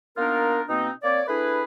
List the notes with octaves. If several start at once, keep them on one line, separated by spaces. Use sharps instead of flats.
A#3 B3 D4 D#4 F4 A#4
B2 A#3 C4 D#4
A#3 C4 C#5 D5
A3 D4 E4 G#4 B4